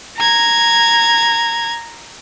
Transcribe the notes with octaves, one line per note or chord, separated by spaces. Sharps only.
A#5 G#6